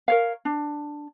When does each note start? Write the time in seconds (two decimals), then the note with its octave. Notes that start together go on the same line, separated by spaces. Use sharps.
0.08 A#4 C#5 F5
0.45 D4